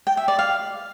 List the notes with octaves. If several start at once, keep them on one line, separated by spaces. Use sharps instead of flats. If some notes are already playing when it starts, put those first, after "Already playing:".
G5
E5
D5
F5